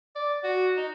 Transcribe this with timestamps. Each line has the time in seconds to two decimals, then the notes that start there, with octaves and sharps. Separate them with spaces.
0.16 D5
0.44 F#4
0.77 D#4